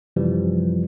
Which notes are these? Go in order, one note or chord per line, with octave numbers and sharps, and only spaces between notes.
F#2 C3 E3 F3 G3